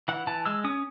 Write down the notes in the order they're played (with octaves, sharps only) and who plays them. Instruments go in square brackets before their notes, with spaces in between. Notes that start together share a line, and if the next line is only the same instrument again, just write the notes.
[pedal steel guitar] E3 F#5
E3 A5
G#3 E6
C#4 D#6